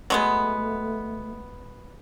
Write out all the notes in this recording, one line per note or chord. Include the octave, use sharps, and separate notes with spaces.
F#3 G#3 A3 B3